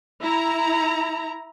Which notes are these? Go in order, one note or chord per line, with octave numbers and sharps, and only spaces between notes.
E4 A#5